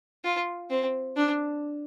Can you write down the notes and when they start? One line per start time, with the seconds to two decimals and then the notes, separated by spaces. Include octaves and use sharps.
0.24 F4
0.70 C4
1.16 D4